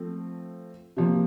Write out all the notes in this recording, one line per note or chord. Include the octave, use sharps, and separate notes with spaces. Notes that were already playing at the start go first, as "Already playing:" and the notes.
Already playing: F3 A3 C4
C3 F3 A#3